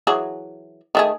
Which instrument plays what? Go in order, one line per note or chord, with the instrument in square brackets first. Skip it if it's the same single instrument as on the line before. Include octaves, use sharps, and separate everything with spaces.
[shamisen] E3 F#3 G#4
D#3 A3 G#4